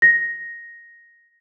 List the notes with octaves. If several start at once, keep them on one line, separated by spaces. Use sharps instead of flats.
A#6